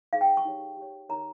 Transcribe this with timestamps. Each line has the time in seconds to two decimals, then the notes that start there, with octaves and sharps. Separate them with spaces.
0.13 D#4 G#4 C5 F5
0.21 G5
0.37 C#6
0.45 D#4 G4 C#5
0.77 G4
0.82 C#5
1.09 D#4 A#4 C#5 A#5